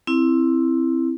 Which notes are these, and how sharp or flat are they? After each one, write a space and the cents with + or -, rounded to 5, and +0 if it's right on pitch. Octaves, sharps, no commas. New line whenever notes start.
C4 +5 E4 +0